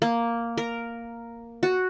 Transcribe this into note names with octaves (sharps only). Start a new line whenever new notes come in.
A#3
A#4
F#4